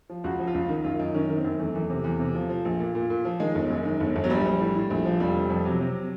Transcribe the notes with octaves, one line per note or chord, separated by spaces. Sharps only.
F3
C#2 F#4
F3
F4
C#2
D#3
F#2 F4
F#2 D#4
D#3 C#4
D#3
C4
F#2
E2 A3
E2
C3
E2
C3
F3
F3
A#1
A#2
A#2
A#2
F3
D#3 G#3
G1
F#2
D#3
G1
G1
F#3
A#1 G3
A#1
A2
A2
A#1
F3
F1 G3
F1
F2
C3 F#3
C3